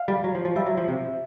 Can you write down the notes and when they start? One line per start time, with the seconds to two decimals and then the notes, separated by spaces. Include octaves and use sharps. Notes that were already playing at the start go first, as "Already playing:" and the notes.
Already playing: F5
0.08 G3
0.24 F#3
0.35 F3
0.45 F3
0.56 G3 E5
0.66 F#3
0.77 F3
0.88 C3